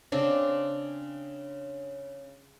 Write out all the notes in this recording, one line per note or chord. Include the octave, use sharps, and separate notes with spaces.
C#3 C4 D4